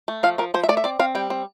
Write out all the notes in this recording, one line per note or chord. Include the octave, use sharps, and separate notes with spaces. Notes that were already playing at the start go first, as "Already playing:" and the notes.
A3
F3 F5
F3 A#4
F3 C5
E5
A3 D5
E5
C4 D5
C4 F5
G3 G5
C4